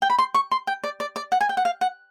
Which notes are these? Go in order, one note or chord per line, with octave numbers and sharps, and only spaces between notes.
G5
B5
C6
C#6
C6
G5
D5
D5
D5
F#5
G#5
G5
F#5
F5
F#5